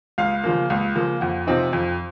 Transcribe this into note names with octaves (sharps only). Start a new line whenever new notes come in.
C#2 F5
C#3 F3 A#3
C#2
C#3 F3 A#3
F2 F#5
C3 F3 C4 D#4
F2